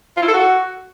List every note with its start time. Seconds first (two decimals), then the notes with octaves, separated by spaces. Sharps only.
0.17 F4
0.23 E4
0.28 A4
0.34 F#4